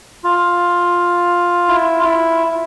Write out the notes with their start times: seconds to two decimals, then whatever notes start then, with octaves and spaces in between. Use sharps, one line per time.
0.24 F4
1.68 E4
1.99 F4
2.05 E4